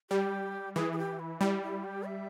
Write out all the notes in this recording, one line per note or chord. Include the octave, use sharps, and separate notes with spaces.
G3 G4
E3 G#4
G#4
G4
E4
G3 E4
E4
G4
E5